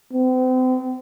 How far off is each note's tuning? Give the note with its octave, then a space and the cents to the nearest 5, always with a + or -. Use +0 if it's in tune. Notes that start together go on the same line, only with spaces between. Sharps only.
C4 -40